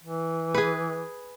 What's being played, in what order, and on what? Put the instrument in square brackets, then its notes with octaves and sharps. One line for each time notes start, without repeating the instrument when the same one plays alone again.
[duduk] E3
[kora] G#4 B4